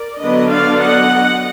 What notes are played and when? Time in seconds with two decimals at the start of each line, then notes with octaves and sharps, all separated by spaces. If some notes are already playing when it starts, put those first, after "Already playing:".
Already playing: A#4 D5
0.20 D3 F#3 B3 D4 B4 D#5
0.50 D5 F5
0.81 D#5 F#5